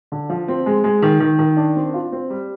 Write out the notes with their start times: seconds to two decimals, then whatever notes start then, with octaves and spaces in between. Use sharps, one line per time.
0.12 D3
0.30 F3
0.48 C4
0.66 G#3
0.84 G#3
1.02 D#3
1.20 D#3
1.39 D#3
1.57 D4
1.76 C4
1.94 F4
2.12 C4
2.30 G3